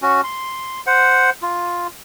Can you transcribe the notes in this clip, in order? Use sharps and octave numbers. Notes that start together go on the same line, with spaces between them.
C#4 F#4
C6
C5 F#5
F4